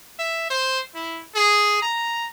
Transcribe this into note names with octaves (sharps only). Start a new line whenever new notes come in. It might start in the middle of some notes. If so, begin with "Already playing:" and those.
E5
C5
E4
G#4
A#5